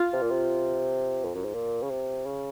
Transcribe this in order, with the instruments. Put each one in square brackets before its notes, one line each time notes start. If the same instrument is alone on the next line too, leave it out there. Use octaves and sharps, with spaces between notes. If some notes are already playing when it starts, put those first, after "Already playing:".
Already playing: [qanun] F4
[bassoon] C3
A#2
C3
F2
F#2
G#2
A#2
C#3
C3
C#3